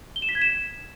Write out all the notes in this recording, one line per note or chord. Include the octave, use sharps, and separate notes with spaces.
G7
E7
B6
G#6
E7